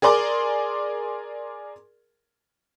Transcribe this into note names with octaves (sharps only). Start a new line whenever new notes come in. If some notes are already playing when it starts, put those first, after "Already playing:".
G#4 A#4 D5 C6 D6